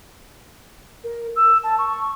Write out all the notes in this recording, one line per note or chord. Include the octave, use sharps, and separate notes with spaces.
A#4
E6
A5
C#6